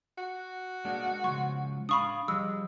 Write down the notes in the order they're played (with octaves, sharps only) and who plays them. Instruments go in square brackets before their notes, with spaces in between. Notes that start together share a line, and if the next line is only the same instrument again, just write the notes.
[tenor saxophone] F#4
[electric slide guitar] G#3 A#3 D4
[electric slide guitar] C#3 F3 G#3 [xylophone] C#6
[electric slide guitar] D4 F5 [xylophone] B5 C#6 D#6
[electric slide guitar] F3 G3 [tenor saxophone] G#3 [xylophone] E6